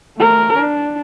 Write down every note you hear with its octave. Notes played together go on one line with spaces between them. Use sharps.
A3 A#4
D4